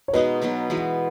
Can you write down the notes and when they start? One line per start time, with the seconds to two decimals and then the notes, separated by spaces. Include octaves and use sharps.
0.08 C#5
0.13 B2 G#3 D#4 F#4 B4 D#5
0.42 B2 F#3 B3 D#4
0.70 E3 G#3 B3 F#4